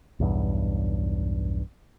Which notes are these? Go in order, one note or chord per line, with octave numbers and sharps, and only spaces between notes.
B1 E2 G2